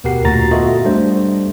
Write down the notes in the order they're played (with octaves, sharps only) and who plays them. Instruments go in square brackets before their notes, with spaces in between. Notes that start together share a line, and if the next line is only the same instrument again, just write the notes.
[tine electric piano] D2 B2 G4 A#4 F#5 C7
D2 A#2 F#4 A#5 A6 A#6
B3 F4 F#4 A4 D#5 E5
G3 A3 D4 C5